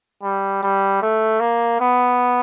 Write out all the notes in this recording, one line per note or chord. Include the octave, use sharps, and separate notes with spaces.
G3
G3
A3
A#3
B3